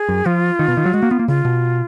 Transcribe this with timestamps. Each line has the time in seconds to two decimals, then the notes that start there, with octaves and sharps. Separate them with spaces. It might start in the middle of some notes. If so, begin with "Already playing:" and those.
Already playing: G#4
0.09 F#2
0.26 F3 F4
0.59 D#3
0.68 B2
0.77 D#3
0.85 F#3
0.94 G#3 F#4
1.03 A#3
1.11 B3 F4
1.19 A#3
1.28 C#3 F4
1.45 B2